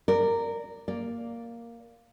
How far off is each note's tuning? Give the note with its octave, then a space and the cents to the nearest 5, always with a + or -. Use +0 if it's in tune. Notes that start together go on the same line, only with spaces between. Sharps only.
A#4 -15 D5 +0
A#3 +0 D5 +0